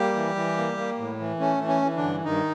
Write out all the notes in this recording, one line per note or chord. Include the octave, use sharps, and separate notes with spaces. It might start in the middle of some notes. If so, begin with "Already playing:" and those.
Already playing: G3 A#3 G4
E3
E3
A#3
A#3
A2
E3
A3 C#4
E3
C#4
E3
D3 D4
G2
G2 D#3 D#4